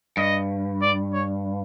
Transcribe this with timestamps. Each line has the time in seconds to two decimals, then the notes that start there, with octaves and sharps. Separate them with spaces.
0.17 G2 D#5
0.82 D5
1.13 C#5